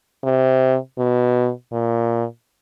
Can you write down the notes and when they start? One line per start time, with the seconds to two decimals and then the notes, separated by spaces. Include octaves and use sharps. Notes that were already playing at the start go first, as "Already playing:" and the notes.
0.24 C3
0.98 B2
1.72 A#2